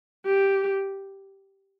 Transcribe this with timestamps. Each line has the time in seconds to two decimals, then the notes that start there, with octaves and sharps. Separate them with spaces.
0.25 G4